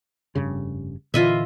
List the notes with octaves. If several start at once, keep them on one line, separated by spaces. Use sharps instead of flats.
F1 G2 C#3
A#2 D3 E3 F4 D#5 E5